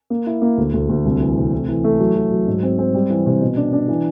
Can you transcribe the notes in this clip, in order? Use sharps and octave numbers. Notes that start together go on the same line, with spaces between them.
A#3
E4
A#3
D2
D2
D2
C2
E3
C3
A3
E3
A3
F#3
F#3
F#3
G#2
C4
C4
G3
E3
C3
B2
D4
D4
E3